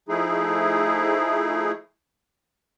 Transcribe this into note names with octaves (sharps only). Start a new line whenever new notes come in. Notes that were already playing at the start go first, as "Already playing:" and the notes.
F3 A3 D#4 E4 G#4